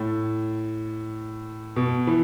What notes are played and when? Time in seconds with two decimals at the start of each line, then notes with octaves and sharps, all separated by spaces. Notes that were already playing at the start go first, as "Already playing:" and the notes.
Already playing: A2
1.76 B2
2.07 E3